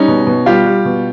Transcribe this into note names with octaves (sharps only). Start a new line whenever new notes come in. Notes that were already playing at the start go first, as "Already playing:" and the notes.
Already playing: G3 C#4 D#4
B2
B2
G3 F4 G4
G3
B2